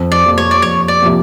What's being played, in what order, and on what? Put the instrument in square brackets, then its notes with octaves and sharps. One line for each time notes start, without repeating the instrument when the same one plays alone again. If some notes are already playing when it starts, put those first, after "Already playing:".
Already playing: [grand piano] F2
[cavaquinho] D5
[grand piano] C3 F3 A#3
[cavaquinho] C#5
D5
[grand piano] F2 [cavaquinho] C#5
[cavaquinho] D5
[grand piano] C3 F3 A#3